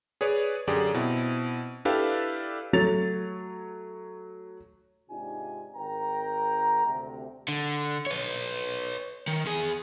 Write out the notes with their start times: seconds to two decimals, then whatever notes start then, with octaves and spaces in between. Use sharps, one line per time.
0.21 G#4 B4 C#5 D5
0.67 F#2 D3 G4 G#4 D5
0.94 B2 C4 E4
1.85 D4 E4 G4 A4 B4 F5
2.73 F#3 A3 C#5 A6 F7
5.10 G#2 C3 D4 D#4 F4 G#5
5.76 G#1 A#4 G5 A#5
6.86 D2 C3
7.48 D3
8.06 B4 C#5
9.28 D#3
9.46 E2 G#4